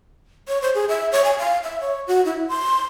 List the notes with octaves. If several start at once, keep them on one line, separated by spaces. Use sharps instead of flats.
C#5
C5
G#4
E5
C#5
G#5
F5
E5
C#5
F#4
E4
C6